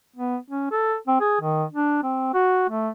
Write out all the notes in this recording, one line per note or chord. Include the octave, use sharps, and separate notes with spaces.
B3
C#4
A4
C4
G#4
D#3
D4
C4
F#4
A3